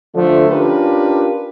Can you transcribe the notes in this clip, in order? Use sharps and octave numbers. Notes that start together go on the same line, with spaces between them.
D3 F3 A3
C#4 D4 F4 G4 A#4 B4